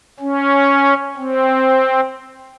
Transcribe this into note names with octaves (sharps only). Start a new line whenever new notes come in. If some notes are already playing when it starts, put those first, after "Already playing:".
C#4
C4